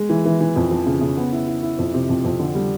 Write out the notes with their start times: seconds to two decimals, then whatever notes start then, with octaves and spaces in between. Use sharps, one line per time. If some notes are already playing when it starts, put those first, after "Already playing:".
Already playing: G#3
0.09 E3
0.25 E3
0.41 E3
0.56 F2
0.71 F3
0.86 C#3
1.01 C#3
1.17 B3
1.32 E4
1.47 E4
1.63 E4
1.78 F2
1.94 C3
2.09 F2
2.24 F2
2.39 D3
2.55 G3